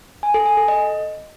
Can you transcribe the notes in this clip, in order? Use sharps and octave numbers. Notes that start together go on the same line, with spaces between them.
G#5
A4
G#5
A4
D#5